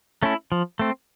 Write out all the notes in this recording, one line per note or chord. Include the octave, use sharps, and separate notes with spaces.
A3 C#4 E4
F3
A3 C4